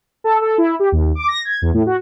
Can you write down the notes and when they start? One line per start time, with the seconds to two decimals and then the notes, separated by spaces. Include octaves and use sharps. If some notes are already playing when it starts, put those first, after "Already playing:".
0.24 A4
0.41 A4
0.58 E4
0.80 G4
0.92 D#2
1.15 D6
1.28 A#6
1.45 G#6
1.62 E2
1.74 A2
1.86 F#4